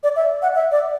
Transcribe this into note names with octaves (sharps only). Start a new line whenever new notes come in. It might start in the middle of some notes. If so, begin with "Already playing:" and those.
D5
E5
F#5
E5
D5